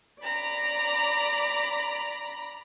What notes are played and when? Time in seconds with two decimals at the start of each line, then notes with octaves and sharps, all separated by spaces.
0.22 D5 A#5 B5